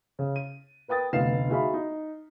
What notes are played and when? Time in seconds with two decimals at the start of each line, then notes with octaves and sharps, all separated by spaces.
0.19 C#3
0.36 D#7
0.88 A#4 B4 G5 D#6 A6
1.13 F1 D2 B3 F5 C7 E7
1.49 D#4 F#4 G#4 E5 F5 B5
1.74 D#4